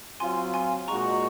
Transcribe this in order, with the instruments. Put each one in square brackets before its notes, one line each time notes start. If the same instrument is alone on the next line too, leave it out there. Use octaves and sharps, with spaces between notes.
[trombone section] F#3 C4 F4 [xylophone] G#5 C6
[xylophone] G#5 C6
[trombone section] A#2 G#3 D#4 F#4 [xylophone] A#5 C#6